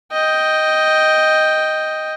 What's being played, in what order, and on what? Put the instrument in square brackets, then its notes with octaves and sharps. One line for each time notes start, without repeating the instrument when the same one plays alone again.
[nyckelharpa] D#5 G5